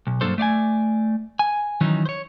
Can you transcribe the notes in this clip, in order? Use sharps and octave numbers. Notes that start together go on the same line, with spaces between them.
B1
G2 F#3 A#3 D4 A4 C5
A3 D5 F5 G#5
G#5
D#3 E3 F#3 C#4 D#4
C5 C#5